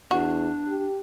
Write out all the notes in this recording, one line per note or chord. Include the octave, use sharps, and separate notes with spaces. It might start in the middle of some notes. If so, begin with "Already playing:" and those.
E2 D4 F#4
G4